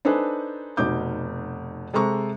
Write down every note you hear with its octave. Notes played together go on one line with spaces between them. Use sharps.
D4 D#4 A4 B4 C5 G#5
F1 B2 D#4 D6 G6
C3 G#3 A4 A#5 C#6